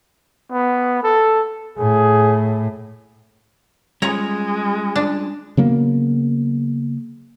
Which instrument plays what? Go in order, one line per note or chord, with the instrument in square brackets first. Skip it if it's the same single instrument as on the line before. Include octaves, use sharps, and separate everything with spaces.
[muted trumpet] B3
A4
[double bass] A2 [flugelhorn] G#4
[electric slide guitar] G3 C#4 F4 [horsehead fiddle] G#3 [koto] C#5 A#5
[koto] D4
[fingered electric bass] C#3 F#3 A#3 B3